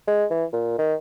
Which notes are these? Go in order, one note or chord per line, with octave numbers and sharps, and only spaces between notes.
G#3
E3
A#2
D#3